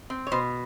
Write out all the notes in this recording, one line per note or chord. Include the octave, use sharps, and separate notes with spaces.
C4
C#5
B2 C5